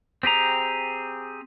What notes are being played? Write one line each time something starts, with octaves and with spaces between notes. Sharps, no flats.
C4 G4 G#4 A#5